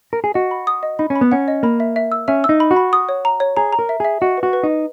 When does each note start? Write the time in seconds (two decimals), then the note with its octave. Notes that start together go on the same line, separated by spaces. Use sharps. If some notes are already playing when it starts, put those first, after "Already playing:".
0.13 A#4
0.24 G#4
0.34 F#4 D#5
0.51 B5
0.67 D#6
0.83 D#5
0.99 D#4 B5
1.10 C#4
1.15 B5
1.21 B3
1.32 C#4 F#5
1.48 D#5
1.63 A#3 B5
1.80 E5
1.96 E5
2.12 E6
2.28 C#4 E5
2.44 E6
2.49 D#4
2.60 B5
2.71 F#4
2.76 B5
2.93 D#6
3.09 C#5
3.25 A#5
3.40 C#5
3.57 G#4 A#5
3.73 A#5
3.79 A#4
3.89 E5
4.00 G#4 E5
4.21 F#4 D#5
4.37 B4
4.43 F#4
4.53 B4
4.63 D#4
4.69 D#5